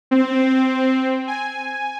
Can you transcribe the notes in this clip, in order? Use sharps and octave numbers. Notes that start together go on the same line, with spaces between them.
C4
G#5